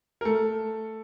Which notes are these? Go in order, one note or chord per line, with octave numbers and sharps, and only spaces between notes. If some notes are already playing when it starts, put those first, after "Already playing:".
A#4
A3 A4